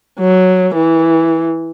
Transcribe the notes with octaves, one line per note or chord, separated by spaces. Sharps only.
F#3
E3